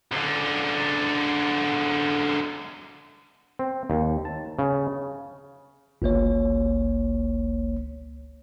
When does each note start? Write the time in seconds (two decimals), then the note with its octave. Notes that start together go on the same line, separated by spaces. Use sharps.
0.12 C#2 D3
3.59 C4
3.90 D#2
4.25 A5
4.59 C#3
6.02 G1 C#2 A#3 C#5